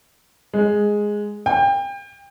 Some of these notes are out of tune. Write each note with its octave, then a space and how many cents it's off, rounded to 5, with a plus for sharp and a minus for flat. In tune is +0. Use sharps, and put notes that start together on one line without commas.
G#3 +0
G5 +30